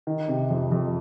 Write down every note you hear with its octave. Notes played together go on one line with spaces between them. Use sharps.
D#3
C3
F2
F2